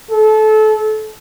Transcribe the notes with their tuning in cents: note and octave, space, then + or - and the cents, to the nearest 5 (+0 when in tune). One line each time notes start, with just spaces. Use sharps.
A4 -25